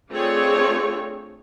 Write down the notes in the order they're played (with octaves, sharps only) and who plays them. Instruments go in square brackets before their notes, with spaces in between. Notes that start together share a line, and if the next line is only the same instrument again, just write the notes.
[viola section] A3 C4 D4 F4 G#4 C#5